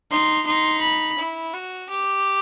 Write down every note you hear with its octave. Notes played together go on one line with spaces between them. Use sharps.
D#4 C6
D#4 C6
B5
E4
F#4
G4